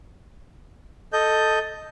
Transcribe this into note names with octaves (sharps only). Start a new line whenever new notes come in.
A4 D#5 G6